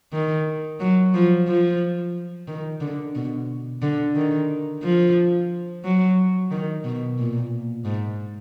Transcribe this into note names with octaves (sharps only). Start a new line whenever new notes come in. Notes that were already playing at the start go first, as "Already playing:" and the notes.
D#3
F#3
F3
F3
D#3
D3
B2
D3
D#3
F3
F#3
D#3
B2
A#2
G#2